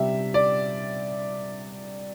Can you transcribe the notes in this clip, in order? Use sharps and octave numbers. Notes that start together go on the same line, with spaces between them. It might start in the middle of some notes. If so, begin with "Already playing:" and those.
Already playing: C3 G3 E5
D5